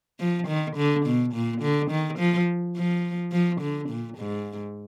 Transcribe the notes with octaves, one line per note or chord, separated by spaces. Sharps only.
F3
D#3
D3
B2
A#2
D3
D#3
F3
F3
F3
D3
A#2
G#2